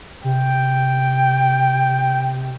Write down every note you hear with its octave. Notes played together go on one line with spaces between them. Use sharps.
C3 G5